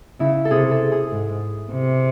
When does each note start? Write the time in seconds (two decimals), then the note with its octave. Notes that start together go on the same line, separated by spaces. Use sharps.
0.20 C#3 E4
0.45 A4
0.51 C3 G#4
0.71 A4
0.92 G#4
1.11 G#2
1.72 C3